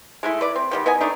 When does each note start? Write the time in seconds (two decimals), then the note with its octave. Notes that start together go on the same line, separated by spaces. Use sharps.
0.23 G#3 A3 E4
0.41 B4 D5
0.56 C4
0.71 D#3 G3 B3
0.86 B3 A#4 D#5 G#5
1.01 A3 D4 D#4